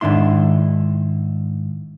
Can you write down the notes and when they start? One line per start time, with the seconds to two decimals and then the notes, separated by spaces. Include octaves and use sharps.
0.01 G#2 D#3 D4 E4 C6